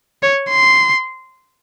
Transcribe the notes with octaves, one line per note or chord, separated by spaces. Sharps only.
C#5
C6